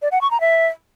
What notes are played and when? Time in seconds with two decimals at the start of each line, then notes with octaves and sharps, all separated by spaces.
0.02 D5
0.12 F#5
0.21 C#6
0.31 A#5
0.41 E5